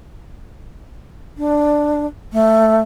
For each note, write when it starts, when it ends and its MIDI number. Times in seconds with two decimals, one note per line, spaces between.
1.38 2.06 62
2.33 2.81 57